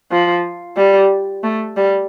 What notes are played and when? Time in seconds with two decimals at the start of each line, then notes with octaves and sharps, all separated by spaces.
0.12 F3
0.77 G3
1.43 A3
1.77 G3